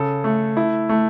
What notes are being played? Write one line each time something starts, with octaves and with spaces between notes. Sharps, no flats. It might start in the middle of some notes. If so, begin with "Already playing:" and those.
Already playing: C#3 A4
A3
E4
A3